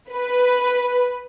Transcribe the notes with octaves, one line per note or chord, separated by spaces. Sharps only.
B4